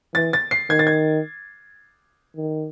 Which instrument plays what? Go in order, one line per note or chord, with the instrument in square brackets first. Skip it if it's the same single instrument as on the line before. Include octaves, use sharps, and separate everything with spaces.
[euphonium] E3 [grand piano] A6
[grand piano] A6
C7
[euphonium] D#3 [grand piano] G#6
[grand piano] A6
G#6
[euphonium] D#3